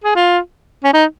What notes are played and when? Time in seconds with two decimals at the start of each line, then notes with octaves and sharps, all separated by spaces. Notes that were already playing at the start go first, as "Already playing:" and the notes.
0.04 G#4
0.15 F4
0.84 C#4
0.93 D#4